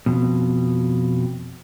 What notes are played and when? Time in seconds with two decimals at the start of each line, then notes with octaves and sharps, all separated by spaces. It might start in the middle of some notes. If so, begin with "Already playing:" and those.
0.06 F2 B2